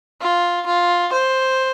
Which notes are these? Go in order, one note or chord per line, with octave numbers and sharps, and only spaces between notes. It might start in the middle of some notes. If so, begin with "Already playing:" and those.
F4
F4
C5